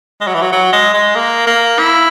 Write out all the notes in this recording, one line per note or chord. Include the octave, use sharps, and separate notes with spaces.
G#3
F#3
E3
F#3
F#3
G#3
G#3
A#3
A#3
E4